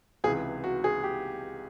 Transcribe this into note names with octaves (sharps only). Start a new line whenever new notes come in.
C#2 C3 E3 G#4
F#4
G#4
G4